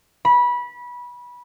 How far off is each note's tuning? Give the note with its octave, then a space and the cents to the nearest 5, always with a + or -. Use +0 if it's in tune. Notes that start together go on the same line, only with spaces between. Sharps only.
B5 -20